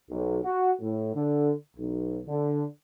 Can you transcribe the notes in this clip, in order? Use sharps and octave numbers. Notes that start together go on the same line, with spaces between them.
B1
F#4
A2
D3
B1
D3